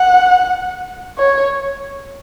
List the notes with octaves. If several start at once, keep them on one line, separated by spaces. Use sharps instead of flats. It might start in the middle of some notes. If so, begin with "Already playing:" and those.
Already playing: F#5
C#5